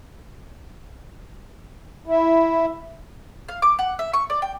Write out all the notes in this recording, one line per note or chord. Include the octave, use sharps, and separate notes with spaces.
E4
F5
D6
F#5
E5
C#6
D5
G5